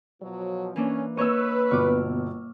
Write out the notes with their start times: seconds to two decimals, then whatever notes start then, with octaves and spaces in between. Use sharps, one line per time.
0.22 B2 F3 F#3
0.76 E3 A#3 C#4 D4
1.17 A#3 B4 C#5 D#5 C#6 E6
1.71 G1 B2 C#6 D6 F6